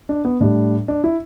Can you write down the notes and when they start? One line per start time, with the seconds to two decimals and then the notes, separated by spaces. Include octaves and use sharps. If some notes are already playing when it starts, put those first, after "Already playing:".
0.09 D4
0.25 B3
0.40 A2 G3 D4
0.88 D4
1.04 E4